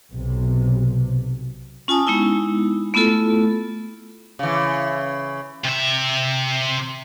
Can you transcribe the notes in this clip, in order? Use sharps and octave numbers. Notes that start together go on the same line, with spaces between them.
B1 C3
C#4 F4 G#5 A5 D#6
G#3 B3 D#4 E4
A3 B3 E4 F4 A4
C#3 E3
C3 E5